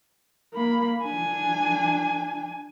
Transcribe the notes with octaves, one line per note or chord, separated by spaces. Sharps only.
A#3 B5
D4 G#5